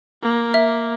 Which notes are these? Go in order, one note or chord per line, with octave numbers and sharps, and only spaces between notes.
A#3
E5